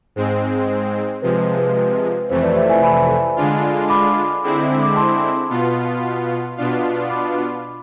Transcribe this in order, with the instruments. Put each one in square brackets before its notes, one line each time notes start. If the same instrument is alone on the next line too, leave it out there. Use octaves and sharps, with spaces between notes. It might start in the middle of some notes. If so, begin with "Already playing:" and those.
[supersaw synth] G#2 G#3 C4 [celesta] C5
[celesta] C5
[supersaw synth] C3 F3 G#3 [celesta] B4
[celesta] C5
B4
B4
[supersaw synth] F2 C3 E3 A3 [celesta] C5
[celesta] B4 D5
C5 E5
E5 G#5
G#5 B5
[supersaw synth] D3 G#3 D4 F4
[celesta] B5 D6
[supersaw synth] D3 G#3 C4 E4
[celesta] D6
A5 C6
[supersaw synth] B2 B3 F4
B2 B3 D4 F4
[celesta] B5 D6